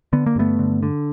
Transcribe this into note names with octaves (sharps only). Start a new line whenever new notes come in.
D3 B3
A#3
G2 A3 B3
D3
D3